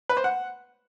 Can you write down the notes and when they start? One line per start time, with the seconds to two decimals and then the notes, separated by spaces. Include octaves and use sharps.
0.09 B4
0.17 C5
0.24 F#5